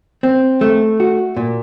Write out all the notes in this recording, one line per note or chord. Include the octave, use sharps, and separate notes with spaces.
C4
A3
F#4
A#2